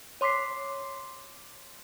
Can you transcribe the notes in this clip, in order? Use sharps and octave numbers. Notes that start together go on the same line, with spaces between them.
C#5 C6 D6 B6 C7